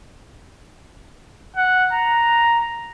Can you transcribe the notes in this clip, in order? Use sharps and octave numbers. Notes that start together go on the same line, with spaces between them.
F#5
A#5